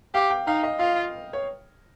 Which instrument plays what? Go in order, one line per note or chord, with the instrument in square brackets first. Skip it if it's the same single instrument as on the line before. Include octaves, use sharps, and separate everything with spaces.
[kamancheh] G4 [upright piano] F5
[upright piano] G5
[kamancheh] D#4 [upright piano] F5
[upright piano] D#5
[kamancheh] F4 [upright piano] F5
[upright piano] C#5